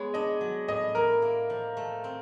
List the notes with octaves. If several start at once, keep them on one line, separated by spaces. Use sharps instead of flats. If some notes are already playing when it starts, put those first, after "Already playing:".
Already playing: G#3 B3 C#5
D4 D#5
F#3
A2 D#5
E4 A#4
A#3
F3
A3
C4